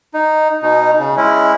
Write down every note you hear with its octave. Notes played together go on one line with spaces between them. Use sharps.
D#4
B2 D#4
C#3
G#3 C#4 E4